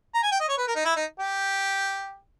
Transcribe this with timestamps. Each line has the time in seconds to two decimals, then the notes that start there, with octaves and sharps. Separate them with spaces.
0.14 A#5
0.23 G#5
0.32 G5
0.40 D#5
0.49 C#5
0.58 B4
0.67 A#4
0.76 D#4
0.85 E4
0.96 D#4
1.20 G4